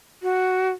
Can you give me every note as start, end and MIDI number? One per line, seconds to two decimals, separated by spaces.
0.23 0.70 66